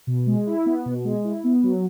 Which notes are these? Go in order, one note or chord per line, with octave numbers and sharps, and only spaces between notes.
B2
G#3
E4
B3
B2
G#3
E4
B3
F#3